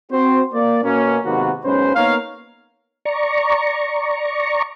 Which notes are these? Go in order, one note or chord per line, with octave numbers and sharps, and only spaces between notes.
C4 F#4 C5
A#3 D5
B2 A#3 C#4
G#2 C3 D#3 A#3 B3 F#4
B1 G#2 C#4 B4 C5
A#3 B3 D#4 A#4 C#5 F5
D5 A#5 C#6